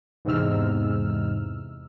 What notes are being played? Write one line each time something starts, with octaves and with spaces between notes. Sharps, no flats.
E2 G#2 C3 D#4 E6 F6